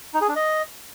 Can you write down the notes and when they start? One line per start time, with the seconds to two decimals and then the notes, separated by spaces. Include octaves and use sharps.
0.14 D#4
0.21 G#4
0.28 D4
0.36 D#5